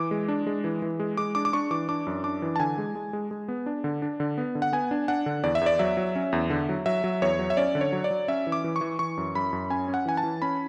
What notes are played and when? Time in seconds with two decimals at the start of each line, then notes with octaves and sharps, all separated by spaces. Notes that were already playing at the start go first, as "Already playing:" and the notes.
Already playing: E3 D6
0.11 G#3
0.29 D4
0.47 G#3
0.64 E3
0.82 E3
1.00 G#3
1.17 G#3 D6
1.35 D4 D6
1.45 D6
1.53 D4 C#6
1.71 E3 D6
1.89 D4 D6
2.07 F#2
2.24 D4 D6
2.42 E3
2.56 A5
2.60 D3 G#5
2.78 G#3
2.95 G#3
3.13 G#3
3.31 G#3
3.48 B3
3.66 D4
3.84 D3
4.02 D4
4.20 D3
4.38 B3
4.55 D3
4.62 F#5
4.73 B3 G#5
4.91 D4
5.08 D4 F#5
5.26 D3
5.43 E2 D5
5.55 E5
5.61 E2 D5
5.79 F#3 E5
5.97 F#3
6.15 C#4
6.32 E2
6.50 D3
6.69 F#3
6.86 F#3 E5
7.04 F#3
7.22 E2 C#5
7.39 F#3
7.50 E5
7.57 C#4 D5
7.75 D3
7.81 C#5
7.92 F#3
8.04 D5
8.10 F#3
8.28 C#4 E5
8.47 E3
8.52 D6
8.64 E3
8.76 C#6
8.81 E3
8.99 E3 C#6
9.17 F#2
9.35 F#2 B5
9.53 F#2
9.70 C#4 G#5
9.88 C#4
9.94 F#5
10.05 E3 G#5
10.17 A5
10.23 E3
10.42 C#4 B5